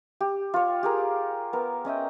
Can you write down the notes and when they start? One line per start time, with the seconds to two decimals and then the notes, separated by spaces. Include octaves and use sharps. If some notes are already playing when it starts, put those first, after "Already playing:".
0.21 G4
0.54 F4 C#5
0.83 G4 G#4 A#4
1.53 B3 A#4
1.85 C#4 D#5 E5 G5